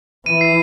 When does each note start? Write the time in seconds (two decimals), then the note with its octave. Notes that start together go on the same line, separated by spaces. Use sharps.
0.26 E3 D#7
0.41 C7